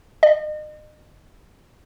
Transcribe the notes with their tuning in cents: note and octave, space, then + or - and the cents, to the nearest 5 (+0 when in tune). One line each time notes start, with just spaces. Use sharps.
D#5 -35